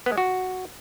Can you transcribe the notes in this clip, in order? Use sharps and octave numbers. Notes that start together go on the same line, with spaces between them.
B3
G#3
F#4